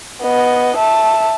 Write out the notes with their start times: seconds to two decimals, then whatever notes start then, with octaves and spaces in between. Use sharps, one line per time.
0.23 B3 D#5
0.77 E5 A5